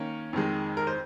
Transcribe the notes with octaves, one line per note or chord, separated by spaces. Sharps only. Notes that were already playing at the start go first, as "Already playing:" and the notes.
Already playing: D#3 A#3 C#4
F2 D#3 G#3
A#4
C5